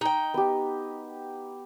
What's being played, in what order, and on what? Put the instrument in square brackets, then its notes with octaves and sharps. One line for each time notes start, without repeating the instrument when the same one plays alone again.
[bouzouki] D#4 G5
[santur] B3 G4